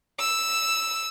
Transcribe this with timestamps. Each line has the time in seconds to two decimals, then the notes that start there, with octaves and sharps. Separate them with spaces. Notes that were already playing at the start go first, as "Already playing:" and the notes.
0.19 E6